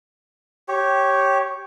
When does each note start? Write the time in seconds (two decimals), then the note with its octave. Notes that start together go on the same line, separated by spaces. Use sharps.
0.68 G4 C#5